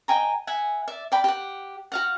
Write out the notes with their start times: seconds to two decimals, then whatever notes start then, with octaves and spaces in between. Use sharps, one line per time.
0.08 D#5 G5 G#5 A#5
0.47 E5 F#5 G#5
0.88 D5 E5
1.12 D5 G5 B5
1.24 G4 F#5
1.92 F#4 F5 F#5